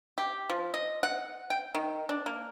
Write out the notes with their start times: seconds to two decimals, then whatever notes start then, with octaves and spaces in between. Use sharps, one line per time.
0.18 G4
0.50 F3
0.74 D#5
1.03 F#5
1.50 G5
1.75 D#3
2.09 D4
2.26 A#3